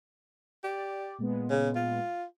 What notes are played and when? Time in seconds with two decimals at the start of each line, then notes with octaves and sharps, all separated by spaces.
0.64 G4 D5
1.18 A#2 G#3 B3
1.50 C#3
1.75 F4